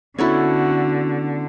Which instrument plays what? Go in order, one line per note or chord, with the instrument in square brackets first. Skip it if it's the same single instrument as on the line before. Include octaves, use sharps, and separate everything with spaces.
[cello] D3 [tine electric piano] B3 C#4 D4 [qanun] E4 A4 C#5 [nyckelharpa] F#4